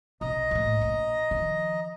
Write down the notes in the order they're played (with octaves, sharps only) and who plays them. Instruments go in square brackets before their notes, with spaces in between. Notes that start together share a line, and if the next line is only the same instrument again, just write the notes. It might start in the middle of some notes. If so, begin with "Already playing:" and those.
[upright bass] B1 [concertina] D#5 A#5
[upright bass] A#1 A2
A#1
D#3 F3